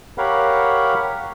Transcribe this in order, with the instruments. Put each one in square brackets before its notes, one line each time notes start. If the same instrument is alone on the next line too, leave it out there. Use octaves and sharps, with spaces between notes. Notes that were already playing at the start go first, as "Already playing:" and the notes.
[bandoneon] G4 A#4 C#5 F5 F#5 B5